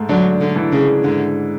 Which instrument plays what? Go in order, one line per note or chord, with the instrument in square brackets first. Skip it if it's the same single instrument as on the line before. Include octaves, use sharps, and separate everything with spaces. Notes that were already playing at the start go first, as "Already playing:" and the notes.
Already playing: [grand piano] G#2 A3
[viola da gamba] D3 F#3 [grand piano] D4
[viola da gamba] D3
[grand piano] E3
[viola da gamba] C#3
[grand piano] G#2 [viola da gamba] D3